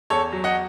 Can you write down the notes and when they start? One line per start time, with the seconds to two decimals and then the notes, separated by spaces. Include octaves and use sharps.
0.10 E2 A4 C#5
0.32 F#3
0.44 D#5 F#5